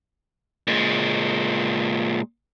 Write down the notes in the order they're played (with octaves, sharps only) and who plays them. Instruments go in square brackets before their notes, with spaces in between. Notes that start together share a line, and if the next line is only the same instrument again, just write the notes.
[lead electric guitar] A#2 G#3